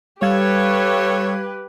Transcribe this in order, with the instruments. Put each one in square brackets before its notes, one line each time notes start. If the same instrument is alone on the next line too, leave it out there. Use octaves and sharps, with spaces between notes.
[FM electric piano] G3 F5 G#6 [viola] G4 B4 [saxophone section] A4 C#5